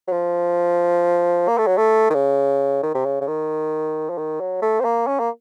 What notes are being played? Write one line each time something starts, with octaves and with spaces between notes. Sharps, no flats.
F#3
F3
A#3
A3
F#3
A3
D#3
C#3
D#3
C3
C#3
C#3
D#3
F3
D#3
F#3
A3
C4
A#3
C#4
A#3